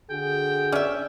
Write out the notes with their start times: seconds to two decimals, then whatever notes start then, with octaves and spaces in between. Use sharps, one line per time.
0.10 D3 F#4 G#4 G5
0.72 C#4 D5 E5